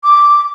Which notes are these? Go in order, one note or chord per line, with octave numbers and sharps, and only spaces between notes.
D6